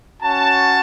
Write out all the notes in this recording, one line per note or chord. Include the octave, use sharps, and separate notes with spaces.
C#4 F#4 A5